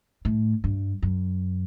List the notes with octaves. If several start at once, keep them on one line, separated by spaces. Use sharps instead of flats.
A2
G2
F#2